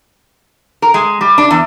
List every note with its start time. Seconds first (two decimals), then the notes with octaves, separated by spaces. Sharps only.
0.82 A#4
0.94 G#3
1.21 G3
1.38 D4
1.50 E2